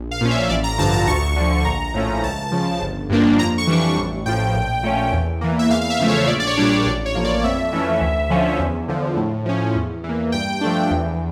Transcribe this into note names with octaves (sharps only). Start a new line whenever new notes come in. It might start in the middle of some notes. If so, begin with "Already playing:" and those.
Already playing: A#1
F5
A#2 F3 C#4
E5
A1 D5
A#5
G2 D3 F3 A5
A#5
D2 C#6
D3 F3
A#1 A#5
A2 F3 A3 C#4
C#2 A5
C#3 F3
G1
G2 F3 A#3 D4
F2 A#5
C#6
E3 G3 D4
A1
A2 F3 G5
A#1
A#2 A3 C#4
E2
E3 A#3
E5
E2 F5
F5
E5
C#3 F3 A3
C#5
A#1 D5
D5
C#5
A#2 G3 D4 D5
C#5
A1 D5
C#5
A2 F3 A#3
D5
F2 E5
E3 A3 C#4
D2
D3 F3 C#4
E2
D3 F3
A2
F3 C#4
E2
E3
A#3
G2 G5
F3 A3 D4
E2